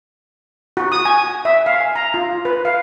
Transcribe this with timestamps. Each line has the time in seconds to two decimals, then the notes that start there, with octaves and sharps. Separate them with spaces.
0.77 F#4
0.92 D#6
1.05 G#5
1.45 E5
1.66 F5
1.81 G#5
1.96 A#5
2.14 F4
2.45 B4
2.65 F5